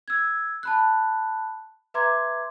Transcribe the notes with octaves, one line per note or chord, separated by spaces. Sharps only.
E6 G#6
A5 B5 F#6
B4 E5 A#5 C6 D6 G#6